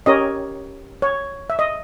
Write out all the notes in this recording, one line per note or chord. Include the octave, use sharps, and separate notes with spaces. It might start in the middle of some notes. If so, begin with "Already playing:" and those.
C#4 G4 A#4 C#5 D#5
C#5
E5
D#5